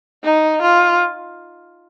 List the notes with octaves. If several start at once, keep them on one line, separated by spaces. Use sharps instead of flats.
D#4
F4